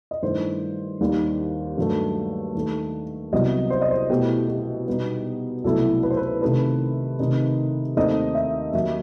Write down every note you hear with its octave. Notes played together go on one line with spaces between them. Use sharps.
D#5
G2 D#3 A3 E4 C5
D#2 D#3 G3
G2 D#3 F#3 A3
D#2 D#3 A3
C2 C3 F#3 B3 D#5
C5
D#5
C5
B2 A3 E4 G4
G4
B2 G3 B3 D#4
C2 B2 F#3 A3 E4 A4
B4
C5
B4
C3 D#3 A3 D#4 B4
C3 D#3 A3 D#4
D#2 D#3 A3 C4 D#4 D#5
E5
D#2 D#3 F#3 E5